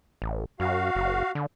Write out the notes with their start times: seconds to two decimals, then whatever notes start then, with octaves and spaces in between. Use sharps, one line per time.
0.22 A1
0.60 F#2 F#4 F5
0.95 F#1
1.35 D3